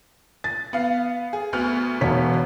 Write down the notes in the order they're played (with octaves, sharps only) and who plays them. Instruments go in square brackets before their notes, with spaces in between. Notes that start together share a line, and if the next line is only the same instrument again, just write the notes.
[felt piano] A6
[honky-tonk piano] B3 F5
G#4
D2 B3 F6
[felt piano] E1 C#5 B6